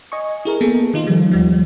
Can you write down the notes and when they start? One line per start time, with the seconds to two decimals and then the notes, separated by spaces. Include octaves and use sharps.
0.12 D#5 G#5 C#6
0.45 E4 G#4 A#4
0.61 A#3 B3 A4
0.94 D#3 D#4 F4
1.07 F3 G3
1.31 D#2 F3 G3